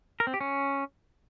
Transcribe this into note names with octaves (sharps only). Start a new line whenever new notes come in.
A#4
C4
G4
C#4